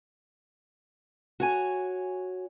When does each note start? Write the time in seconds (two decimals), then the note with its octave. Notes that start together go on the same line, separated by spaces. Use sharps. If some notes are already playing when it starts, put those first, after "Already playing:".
1.40 F#4 C#5 G#5